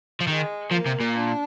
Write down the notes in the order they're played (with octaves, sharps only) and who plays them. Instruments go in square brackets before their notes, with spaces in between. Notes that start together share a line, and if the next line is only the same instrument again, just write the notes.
[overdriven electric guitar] F3
[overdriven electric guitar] D#3 [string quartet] G#3
[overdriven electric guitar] F3 [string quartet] A#3
[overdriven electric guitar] C3
A#2
[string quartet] D4